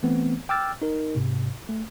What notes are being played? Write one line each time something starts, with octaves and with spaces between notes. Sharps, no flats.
E3 A3 B3 C4
G5 D6 E6 F6 A6
D#4 A#4
G#2 C3
A3